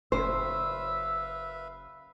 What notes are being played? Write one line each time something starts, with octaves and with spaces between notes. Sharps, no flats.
F#1 B4 C5 E5 F5 E6